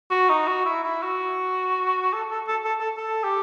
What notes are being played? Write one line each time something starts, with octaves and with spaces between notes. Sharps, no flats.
F#4
D#4
F#4
E4
E4
F#4
A4
A4
A4
A4
A4
A4
G4